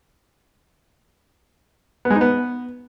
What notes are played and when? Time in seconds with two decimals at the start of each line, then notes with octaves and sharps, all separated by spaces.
2.05 B3
2.10 G#3
2.16 D#4
2.21 B3